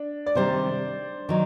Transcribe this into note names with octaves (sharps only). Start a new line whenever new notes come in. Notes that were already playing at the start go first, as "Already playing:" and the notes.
Already playing: D4
D5
C3 D#3 G3 C5
D#3 F#3